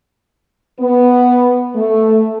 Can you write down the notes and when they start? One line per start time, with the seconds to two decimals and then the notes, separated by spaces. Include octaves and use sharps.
0.79 B3
1.76 A3